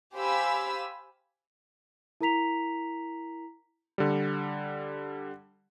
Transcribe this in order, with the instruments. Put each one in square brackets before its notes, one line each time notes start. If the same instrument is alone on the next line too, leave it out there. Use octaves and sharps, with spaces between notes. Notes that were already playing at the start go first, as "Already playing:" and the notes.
[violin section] G4 C5 F5 G#5 B5 E6
[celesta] E4 A#4 A#5 B6 F7
[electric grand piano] D3 G3